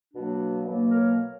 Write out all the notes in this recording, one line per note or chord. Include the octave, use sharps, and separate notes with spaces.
B2 F#3 A#3 D4 F#4
B2 F#3 A#3
A#4 C#5